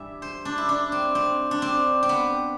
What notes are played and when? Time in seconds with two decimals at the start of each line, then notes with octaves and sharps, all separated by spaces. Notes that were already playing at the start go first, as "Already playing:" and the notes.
Already playing: G2 E3 G3 E5
0.22 C5
0.45 D4
0.58 E4
0.69 D4
0.92 C4
1.15 C4
1.51 D4
1.62 C4
2.03 C4
2.09 B3